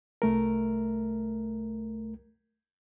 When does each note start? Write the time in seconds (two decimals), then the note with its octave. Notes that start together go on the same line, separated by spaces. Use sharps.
0.22 C2 A3 A#4